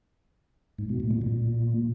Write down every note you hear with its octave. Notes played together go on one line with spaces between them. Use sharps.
G#2
B2
A2
A#2
A#2